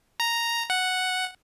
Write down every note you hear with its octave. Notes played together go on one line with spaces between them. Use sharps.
A#5
F#5